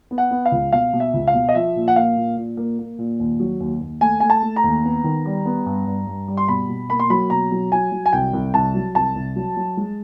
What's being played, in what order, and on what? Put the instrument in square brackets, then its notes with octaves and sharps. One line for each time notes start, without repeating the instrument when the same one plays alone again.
[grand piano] B3
F#5
B3
F5
C#2
B2 F5
B2
E5
C#2
F5
B2
D#5
F3 E5
A#2
F#5
A#3 F5
A#2
A#2
A#3
A#3
A#2
D#2
F#3
D#2
D#2
A3 G#5
A3 G#5
A5
A3
A#5
D#2
B3
D#3
G3
B3
G2
G2
G2
G3
C6
B2 B5
B2
A#3 B5
C6
F#3 B5
B2 A#5
F#3
F#3 G#5
F#3
G#5
C2 G5
C2
C2 A5
F#3
C2 A5
C2
F#3
F#3
G#3